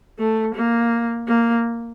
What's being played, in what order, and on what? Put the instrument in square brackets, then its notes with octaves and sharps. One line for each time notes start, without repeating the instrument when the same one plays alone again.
[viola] A3
A#3
A#3